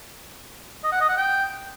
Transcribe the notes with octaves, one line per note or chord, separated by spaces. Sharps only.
D#5
F#5
D#5
F#5
G5